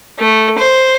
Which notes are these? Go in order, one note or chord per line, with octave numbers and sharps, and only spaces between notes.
A3
C5